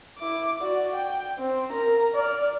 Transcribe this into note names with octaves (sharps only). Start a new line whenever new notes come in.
E4 D6
F#4 D5
G5
C4
A#4 A#5
D5 F6